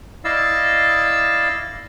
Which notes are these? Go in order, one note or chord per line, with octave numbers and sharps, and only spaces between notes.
E4 D5 D#5 F5 E6